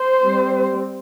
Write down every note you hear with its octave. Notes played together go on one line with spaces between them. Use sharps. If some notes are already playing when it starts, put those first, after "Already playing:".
Already playing: C5
G3 C4